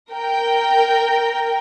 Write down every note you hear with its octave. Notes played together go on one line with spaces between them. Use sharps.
A#4 G5